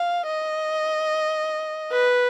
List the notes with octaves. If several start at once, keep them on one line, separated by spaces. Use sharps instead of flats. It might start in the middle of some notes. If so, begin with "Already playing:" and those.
Already playing: F5
D#5
B4